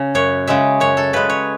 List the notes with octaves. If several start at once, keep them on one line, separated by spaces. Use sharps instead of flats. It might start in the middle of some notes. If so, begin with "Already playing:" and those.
Already playing: C#3
F#2 C#5
C#3 G#3 E5
F#2 C#5
A4
C#3 G#3 B4
C#5